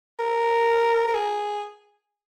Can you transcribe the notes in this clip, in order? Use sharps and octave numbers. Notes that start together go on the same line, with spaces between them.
A#4
A#4
G#4